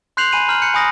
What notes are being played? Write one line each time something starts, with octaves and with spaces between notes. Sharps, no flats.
C6 F#6 G6 C7 F7 F#7
G#5 B5 D#7 F#7
A#5 F6 G6 F#7
F#6 G6 C#7
G#5 B5 D#6 A#6